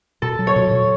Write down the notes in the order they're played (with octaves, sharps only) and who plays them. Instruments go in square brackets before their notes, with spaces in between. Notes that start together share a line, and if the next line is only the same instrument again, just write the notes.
[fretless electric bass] B2 [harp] A4
[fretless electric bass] F#3
[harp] C#5
[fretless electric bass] B2
B2